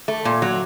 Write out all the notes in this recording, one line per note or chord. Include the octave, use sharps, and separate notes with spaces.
A3
A#2
F#3